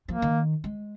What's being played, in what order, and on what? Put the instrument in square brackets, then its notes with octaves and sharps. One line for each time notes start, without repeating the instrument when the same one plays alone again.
[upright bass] F3 [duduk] A#3
[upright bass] D#3
G#3